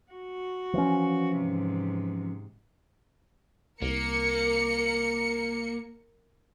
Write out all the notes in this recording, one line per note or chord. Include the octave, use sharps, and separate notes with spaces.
F#4
E3 F3 C#4
G#2 C3
C2 A#3 A#4 C#7